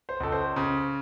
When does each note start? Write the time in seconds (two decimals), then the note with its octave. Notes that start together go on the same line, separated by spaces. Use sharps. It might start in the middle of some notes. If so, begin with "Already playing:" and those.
0.09 C5
0.20 C#2 A4
0.32 C5
0.56 C#3